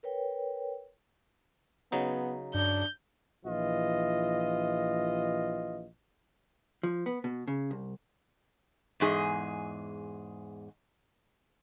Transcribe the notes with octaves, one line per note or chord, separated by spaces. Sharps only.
A#4 B4 C#5 G5
C#3 F#3 B3 D#4
G2 D4 G6
A#1 E3 F4 D#5
F3
B3
B2
C#3
C2
E2 G#2 G#4 D#5